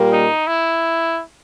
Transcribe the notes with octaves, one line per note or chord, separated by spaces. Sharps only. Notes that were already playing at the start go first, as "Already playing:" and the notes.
Already playing: A#2 G3 A#3
D#4
E4